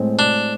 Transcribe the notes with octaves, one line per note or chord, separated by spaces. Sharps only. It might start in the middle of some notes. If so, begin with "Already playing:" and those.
Already playing: A2 G#3 C4
D4